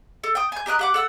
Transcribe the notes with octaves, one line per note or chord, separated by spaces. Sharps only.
A4
G5 D#6
G#5 G6
G4 A#4 D#5 F#6
G4 F#5 D6
A4 F#5 E6